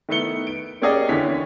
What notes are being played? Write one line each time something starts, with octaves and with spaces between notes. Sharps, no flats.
D#3 A3 B3 E4 C#7 G7
D7
A#3 C#4 G4 G#4 D5 D#5
D#2 D3 E3 C#5 B6